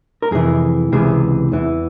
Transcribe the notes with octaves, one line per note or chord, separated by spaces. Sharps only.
A#4
F2 C3 E3 G#4
C#2 C3 E3 G#4
E2 E3